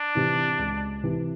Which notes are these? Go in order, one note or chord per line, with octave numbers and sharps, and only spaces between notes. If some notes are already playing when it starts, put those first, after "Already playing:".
Already playing: D4
C3 E3
C#2
C3 E3